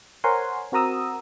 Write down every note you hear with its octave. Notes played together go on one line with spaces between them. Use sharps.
A#4 C5 C#5 F#5 G#5 C6
C4 F#4 A#4 A#5 D#6 E6